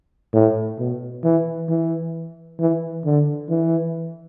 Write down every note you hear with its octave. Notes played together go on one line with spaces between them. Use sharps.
A2
B2
E3
E3
E3
D3
E3